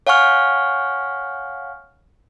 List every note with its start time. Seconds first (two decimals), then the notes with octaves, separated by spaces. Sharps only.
0.07 C#5 F5 F#5 G#5 C#6 F6